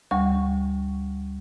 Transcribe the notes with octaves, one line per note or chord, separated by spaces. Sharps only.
D2 G3 C#6